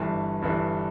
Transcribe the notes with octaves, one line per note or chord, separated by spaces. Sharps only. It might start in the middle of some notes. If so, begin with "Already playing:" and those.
Already playing: G1 G2 E3
G1 G2 E3